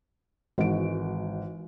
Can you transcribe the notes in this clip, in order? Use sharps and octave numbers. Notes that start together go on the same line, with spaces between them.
G#1 E3 G#3 F#4 D7